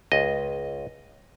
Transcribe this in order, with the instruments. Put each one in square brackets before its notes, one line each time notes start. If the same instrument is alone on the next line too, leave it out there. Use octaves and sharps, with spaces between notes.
[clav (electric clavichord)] C#2 D#5